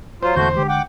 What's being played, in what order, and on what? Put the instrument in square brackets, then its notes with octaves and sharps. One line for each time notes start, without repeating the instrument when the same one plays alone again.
[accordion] F#3 F4 [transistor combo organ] C5
[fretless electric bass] E1 E2 D3 [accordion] A3 F#4 G6
[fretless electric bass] D3 G#3 [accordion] G4
[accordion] F#5 G5 D6